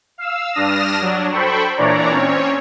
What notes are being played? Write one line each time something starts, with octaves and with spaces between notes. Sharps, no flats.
F5 E6
G2 D4 D#6 F6 A#6 E7
F#3 D4
A4 C5 G5 B5 C#6
A#2 E3 D4 C#5 D5 A#5
C4 C#4 C#5